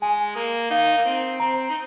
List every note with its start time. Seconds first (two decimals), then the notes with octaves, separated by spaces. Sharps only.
0.01 G#3 G#5
0.36 A#3
0.71 D#4 F5
0.98 A#3
1.05 C4
1.40 C4 A#5
1.70 D#4